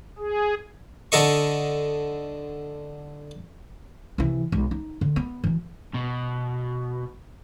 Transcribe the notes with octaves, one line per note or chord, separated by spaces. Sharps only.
G#4
D3 A4 D#5 C#6
C3 E3
B1 G#3
D#4
D3
B3
E3 F#3
B2